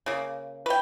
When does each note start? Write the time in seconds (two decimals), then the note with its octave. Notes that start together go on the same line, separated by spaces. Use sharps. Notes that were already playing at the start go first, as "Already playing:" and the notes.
0.06 C#3 A#3
0.66 B4 G5